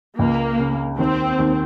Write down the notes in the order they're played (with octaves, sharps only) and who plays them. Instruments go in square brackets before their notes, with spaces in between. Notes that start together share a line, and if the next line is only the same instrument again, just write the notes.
[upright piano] C#2 [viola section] A#3
[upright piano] C#3
[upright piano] D#2 [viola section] C4
[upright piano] D#2